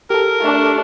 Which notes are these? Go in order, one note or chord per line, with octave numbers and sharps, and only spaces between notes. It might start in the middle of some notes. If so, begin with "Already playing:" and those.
G4 A4 A#4
A3 D4